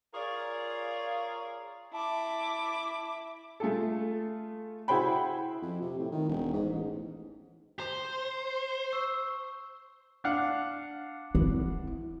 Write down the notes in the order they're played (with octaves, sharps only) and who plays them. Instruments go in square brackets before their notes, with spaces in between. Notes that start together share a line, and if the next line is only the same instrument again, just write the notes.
[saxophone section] F4 G#4 A#4 C#5 D5 F5
[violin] E4 D6 [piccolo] A5
[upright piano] A3 F4 G#4 A4
E4 F#4 G#4 C5 G5 B5
[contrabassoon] F2
C3
A2
D#3
E1
G#2
A1
[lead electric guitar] C5 [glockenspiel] A#5 F7
[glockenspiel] C#6 E6
[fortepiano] D4 F5 F#5
[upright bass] E4